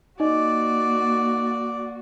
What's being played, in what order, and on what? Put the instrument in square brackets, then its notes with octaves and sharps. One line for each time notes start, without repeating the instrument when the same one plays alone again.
[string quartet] A#3 F#4 [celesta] D#4 D#5 [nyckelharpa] D5